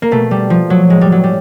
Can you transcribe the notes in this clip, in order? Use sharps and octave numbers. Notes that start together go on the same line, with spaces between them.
A#3
B2 A3
G3
F3
F#3
A2 G#3
G3
F#3
G3